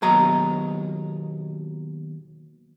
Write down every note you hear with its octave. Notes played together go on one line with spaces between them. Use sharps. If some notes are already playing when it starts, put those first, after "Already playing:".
D#2 B2 F#3 D#5 A#5